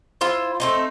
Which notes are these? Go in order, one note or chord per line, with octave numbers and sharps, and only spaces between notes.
E4 F4 C5
A3 C4 D#4